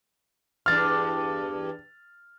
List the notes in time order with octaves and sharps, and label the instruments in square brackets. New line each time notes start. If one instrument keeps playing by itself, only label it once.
[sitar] E2 G2 D4 [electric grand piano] F6 A6